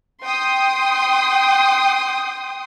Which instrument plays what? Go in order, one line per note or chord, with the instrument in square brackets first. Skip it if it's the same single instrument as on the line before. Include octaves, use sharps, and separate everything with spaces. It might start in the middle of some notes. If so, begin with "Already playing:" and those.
[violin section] G5 C6 D#6